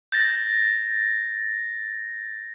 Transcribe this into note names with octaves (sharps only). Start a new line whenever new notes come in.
G6 A6 A#6